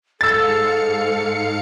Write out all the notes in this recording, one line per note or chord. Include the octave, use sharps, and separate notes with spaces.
G#2 A4 F5 E6 A6 C#7